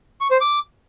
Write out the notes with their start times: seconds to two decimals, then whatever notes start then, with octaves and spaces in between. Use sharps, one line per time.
0.21 C#6
0.31 C5
0.41 D6